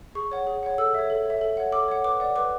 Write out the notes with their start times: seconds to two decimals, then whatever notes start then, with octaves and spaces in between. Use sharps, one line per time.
0.15 G#4 C#6
0.31 C#5 F#5
0.47 G#4
0.63 C#5 F#5
0.78 A4 E6
0.94 C#5 E5
1.10 A4
1.25 C#5 E5
1.41 A4
1.57 C#5 F#5
1.72 A4 D6
1.88 C#5 F#5
2.04 B4 D6
2.20 D5 F#5
2.36 B4 D6